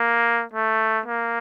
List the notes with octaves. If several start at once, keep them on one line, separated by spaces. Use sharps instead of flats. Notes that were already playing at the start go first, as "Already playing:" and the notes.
Already playing: A#3
A3
A#3